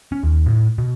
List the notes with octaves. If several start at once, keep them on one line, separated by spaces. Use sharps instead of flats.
C#4
D#2
A2
B2